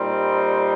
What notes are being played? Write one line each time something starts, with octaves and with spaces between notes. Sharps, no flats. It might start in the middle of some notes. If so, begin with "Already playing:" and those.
Already playing: A#2 G3 C4 D#4